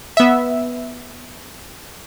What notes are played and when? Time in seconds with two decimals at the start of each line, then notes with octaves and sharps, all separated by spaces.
0.17 B3 E5